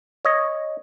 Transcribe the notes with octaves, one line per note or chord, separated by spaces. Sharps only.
C#5 D#5